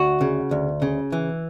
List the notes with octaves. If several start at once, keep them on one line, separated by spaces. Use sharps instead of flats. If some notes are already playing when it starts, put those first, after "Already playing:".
Already playing: D2 F#4
C#3
D2
C#3
E3